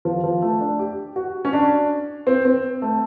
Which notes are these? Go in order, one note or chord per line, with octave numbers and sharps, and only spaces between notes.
F3
F3
A3
D4
G4
F#4
C#4
D4
C4
C4
A3